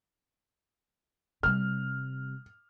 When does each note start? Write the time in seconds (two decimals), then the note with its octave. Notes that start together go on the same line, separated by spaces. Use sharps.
1.43 C3 G3 F6